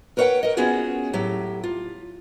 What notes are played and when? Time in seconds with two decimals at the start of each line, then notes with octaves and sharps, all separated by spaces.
0.17 A#4 B4 C#5 D#5 F#5 G5
0.43 A#4 D#5
0.57 B3 C#4 F4 F#4 G#4 C#5
1.13 A2 F#3 G4
1.64 F4